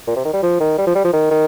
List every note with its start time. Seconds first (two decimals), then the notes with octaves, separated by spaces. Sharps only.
0.07 A#2
0.16 C3
0.25 D#3
0.34 G3
0.43 F3
0.60 D#3
0.78 G3
0.87 F3
0.95 G3
1.04 F3
1.13 D#3
1.31 D#3